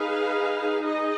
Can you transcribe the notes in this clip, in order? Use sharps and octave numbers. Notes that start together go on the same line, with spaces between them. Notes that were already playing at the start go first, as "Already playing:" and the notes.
Already playing: D#4 G#4 B4 F5
D#4 G#4 D#5